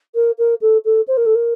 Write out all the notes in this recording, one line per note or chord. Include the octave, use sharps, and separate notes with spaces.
A#4
A#4
A4
A4
C5
A#4
A4
A#4